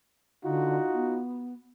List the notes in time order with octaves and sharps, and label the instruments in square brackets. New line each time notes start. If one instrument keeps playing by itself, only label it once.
[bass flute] D3 [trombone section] D#4 F4 F#4
[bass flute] B3